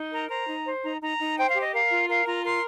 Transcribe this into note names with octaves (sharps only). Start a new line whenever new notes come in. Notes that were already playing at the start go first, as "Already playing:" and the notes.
Already playing: D#4
A#4 A#5
C5 A#5
D#4
C5
D#4 A#5
D#4 A#5
D#4
C5 G5
F5
G4
D#5
A#4 F5
F4
A#4 F5
F4 A#5
A#4 C6